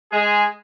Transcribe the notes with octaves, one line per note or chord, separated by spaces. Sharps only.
G#3 G#4